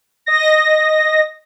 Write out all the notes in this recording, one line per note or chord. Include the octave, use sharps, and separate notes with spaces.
D#5 A#6